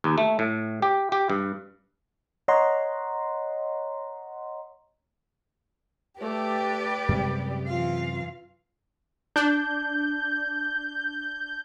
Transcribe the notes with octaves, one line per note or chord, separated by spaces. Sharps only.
D#2
A3
A2
G4
G4
G2
C#5 D#5 F#5 A#5 C6
A3 G4 B4 D5
F#2 C3 G3 G#3
E3 F4 F5
D4 G6